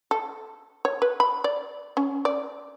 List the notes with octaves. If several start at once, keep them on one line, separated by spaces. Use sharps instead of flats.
A4
C#5
B4
B5
D5
C#4
D5